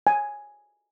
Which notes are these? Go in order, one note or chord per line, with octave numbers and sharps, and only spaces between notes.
G#5